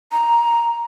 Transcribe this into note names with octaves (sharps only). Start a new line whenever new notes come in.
A#5